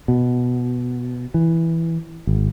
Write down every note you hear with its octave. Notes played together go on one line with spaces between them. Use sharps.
B2
E3
G#1